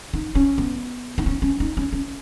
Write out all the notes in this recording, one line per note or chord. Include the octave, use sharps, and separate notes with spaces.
D#4
C#4
B3
D#4
C#4
C#4
D#4
C#4
C#4